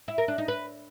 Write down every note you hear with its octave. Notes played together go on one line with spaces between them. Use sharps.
E4
A#4
D4
D#4
B4